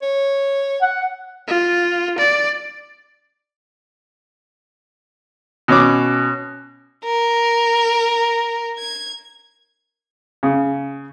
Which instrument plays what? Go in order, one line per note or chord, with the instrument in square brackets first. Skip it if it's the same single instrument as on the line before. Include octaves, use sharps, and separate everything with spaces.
[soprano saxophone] C#5
[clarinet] F#5
[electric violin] F4
D5
[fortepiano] B2 C#4 D6
[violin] A#4
G#6
[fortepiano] C#3